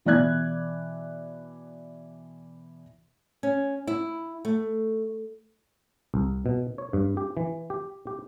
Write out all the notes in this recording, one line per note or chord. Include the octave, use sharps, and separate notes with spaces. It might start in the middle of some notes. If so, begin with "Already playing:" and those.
B2 E3 D5 F#6 G#6
C#4
E4
A3
C2
B2
C#5
G2
G4
E3
G4
G4